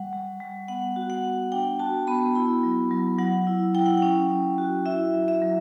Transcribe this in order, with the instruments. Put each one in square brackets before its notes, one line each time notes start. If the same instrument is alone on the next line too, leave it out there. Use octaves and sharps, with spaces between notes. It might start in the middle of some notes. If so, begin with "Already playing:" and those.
Already playing: [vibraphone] G3 F#5
G3
G3
B3 F#5
F#4
F#5
B3
D4 G5
F#4 A5
B3 B5
E4 B5
F#3
F#3
F#3 F#5
E4
E4 G5
F#5
C#4 G5
F#3
F#4
E4 E5
F#3
E5
F#3